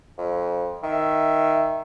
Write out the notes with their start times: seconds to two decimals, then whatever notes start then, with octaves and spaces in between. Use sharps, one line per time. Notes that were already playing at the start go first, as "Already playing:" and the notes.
0.18 F2
0.83 D#3 E5